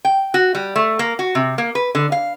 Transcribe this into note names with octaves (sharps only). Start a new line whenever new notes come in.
G5
F#4
G3
A3
A#3
F#4
C3
A#3
B4
D3
F5